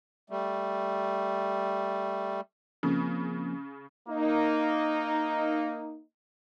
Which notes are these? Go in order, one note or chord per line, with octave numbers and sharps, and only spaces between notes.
G3 A3
C#3 F3 A#3 C4
A#3 D#4